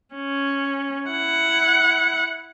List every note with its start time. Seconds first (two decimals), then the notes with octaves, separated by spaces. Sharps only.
0.15 C#4
1.08 E4 F#5